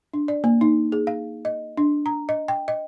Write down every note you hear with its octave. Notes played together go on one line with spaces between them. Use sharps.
D4
D5
A#3
D#4
G#4
F5
D#5
D4
A#5
D#5
G5
D#5